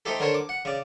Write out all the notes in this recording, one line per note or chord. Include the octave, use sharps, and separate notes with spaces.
A3 C4 D#4 G4 A4
D3 A#4 C5 C#5 A5
D6
F#5
C#3 D5